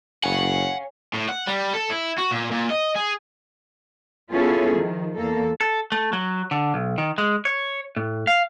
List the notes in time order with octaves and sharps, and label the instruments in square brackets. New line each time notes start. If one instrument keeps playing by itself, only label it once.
[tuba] F#1 [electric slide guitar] C#5 F5 G#5 [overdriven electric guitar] F#5
[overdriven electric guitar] A2
F#5
G3
A4
E4
F#4
A#2
A#2
D#5
G#4
[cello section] B3 C#4 E4 F4 G#4 A4
D#3 F3
E2 A#3 A4
[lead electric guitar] A4
A3
F#3
D3
B1
D#3
G#3
C#5
A2
F5